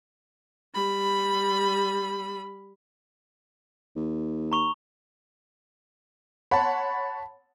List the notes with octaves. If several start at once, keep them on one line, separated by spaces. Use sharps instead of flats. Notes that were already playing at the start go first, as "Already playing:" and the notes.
G3 B5
D#2
A#5 C#6 F7
C#5 F#5 A5 B5 C6